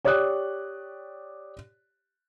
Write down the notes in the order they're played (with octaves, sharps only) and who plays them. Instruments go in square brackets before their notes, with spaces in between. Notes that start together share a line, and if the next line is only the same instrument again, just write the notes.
[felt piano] G4 C#5 D5 D#6 F#6